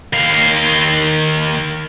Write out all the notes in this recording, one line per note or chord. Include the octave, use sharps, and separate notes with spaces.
D#3 F5